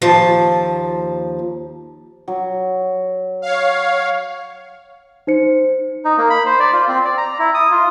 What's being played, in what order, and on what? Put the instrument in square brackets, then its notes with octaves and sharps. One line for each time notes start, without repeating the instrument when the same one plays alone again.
[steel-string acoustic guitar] D#2 F3 A5
[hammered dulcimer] F#3
[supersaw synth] C#5 F5
[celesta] D#4 C5 C#7
[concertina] D#4
A#3
B5
C5
D5
F4
C4
D5
A#5
E4
D#6
F4